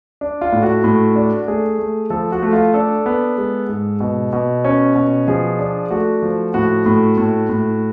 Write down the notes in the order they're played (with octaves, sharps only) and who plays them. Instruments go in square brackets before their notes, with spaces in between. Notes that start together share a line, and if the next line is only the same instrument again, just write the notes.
[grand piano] D4
F4
A2
F#4
A2
D4
A3 G#4
A3
F3 A4
F#4
A3
F4
D4 A4
B3
G#3
G#2
B2
B2
C#4
B2
F3 G#4
D4
A3 F#4
F3
A2 F#4
A2
A2
A2